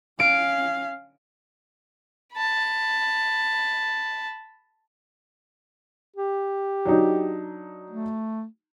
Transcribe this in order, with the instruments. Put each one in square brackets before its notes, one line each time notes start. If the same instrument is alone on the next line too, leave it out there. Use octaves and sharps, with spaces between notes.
[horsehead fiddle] C#4 F5 [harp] D7
[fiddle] A5 B5
[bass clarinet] G4
[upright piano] F#3 D4 D#4
[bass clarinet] A3